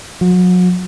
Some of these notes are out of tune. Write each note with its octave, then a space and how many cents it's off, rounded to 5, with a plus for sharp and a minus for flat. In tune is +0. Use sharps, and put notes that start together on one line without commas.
F#3 -35